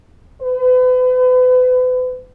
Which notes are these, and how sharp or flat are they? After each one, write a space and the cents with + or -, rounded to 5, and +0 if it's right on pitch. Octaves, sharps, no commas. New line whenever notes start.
B4 +40